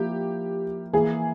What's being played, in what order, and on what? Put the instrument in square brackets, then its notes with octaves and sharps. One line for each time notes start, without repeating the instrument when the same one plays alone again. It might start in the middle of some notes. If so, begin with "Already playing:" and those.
Already playing: [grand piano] F3 A#3 E4 [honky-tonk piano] G4
[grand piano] E3 A#3 E4 [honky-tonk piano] G#4